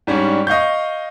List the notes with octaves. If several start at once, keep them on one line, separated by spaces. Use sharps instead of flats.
G#2 G3 C#4 D4
D#5 F5 C#6 G6